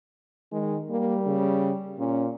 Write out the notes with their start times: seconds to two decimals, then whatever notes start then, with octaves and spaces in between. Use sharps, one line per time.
0.52 D#3 G#3
0.90 G3 A#3
1.26 C#3
1.99 A#2 C#4